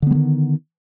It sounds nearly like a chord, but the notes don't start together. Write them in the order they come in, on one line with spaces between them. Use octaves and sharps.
D3 B3 G3 D#3